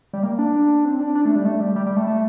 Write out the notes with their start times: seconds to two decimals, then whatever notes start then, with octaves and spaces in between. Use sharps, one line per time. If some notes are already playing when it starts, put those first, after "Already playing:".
0.13 G3
0.23 A#3
0.39 D4
0.85 C4
1.00 D4
1.15 D4
1.25 A3
1.36 G3
1.45 A3
1.60 G3
1.76 G3
1.86 G3
1.97 A3
2.07 A3